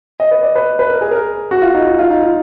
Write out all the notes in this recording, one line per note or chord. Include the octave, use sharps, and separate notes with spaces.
D#5
B4
D5
B4
B4
A#4
G#4
A#4
F#4
F4
D#4
F4
F4
D#4
F4